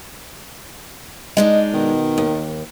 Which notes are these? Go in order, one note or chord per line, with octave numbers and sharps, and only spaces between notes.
G#3 D4 D#4 D#5
B2 D#3
D#2